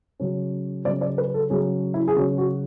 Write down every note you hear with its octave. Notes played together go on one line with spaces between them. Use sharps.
C#3 F#3 C#4
C#3 F#3 C#4 D5
D5
B4
A4
C#3 F#3 C#4 G#4
E4
G#4
C#3 F#3 C#4 F#4
F#4